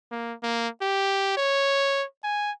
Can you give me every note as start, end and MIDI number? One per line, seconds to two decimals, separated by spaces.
0.11 0.34 58
0.43 0.68 58
0.82 1.37 67
1.37 2.05 73
2.23 2.51 80